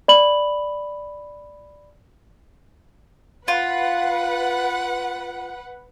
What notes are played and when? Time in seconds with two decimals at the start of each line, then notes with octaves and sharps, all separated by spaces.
0.08 D5 B5 F#7
3.48 F4 B4 F#5